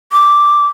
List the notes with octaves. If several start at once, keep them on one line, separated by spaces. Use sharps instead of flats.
D6